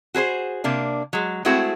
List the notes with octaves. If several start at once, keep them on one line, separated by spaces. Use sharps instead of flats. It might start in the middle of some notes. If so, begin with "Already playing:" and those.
F#4 G#4 B4 C5
C3 A#3 D4
F#3 G#3
G#3 A3 C4 E4 F#4 G#4